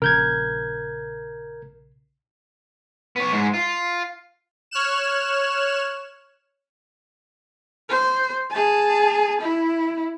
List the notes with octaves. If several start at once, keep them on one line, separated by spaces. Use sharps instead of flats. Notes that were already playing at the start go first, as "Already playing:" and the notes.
A#1 C#3 A#4 G6 G#6
B3 C#5
G#2 G#3
F4
C#5 F6 F#6 E7
C5
G#4 A5
E4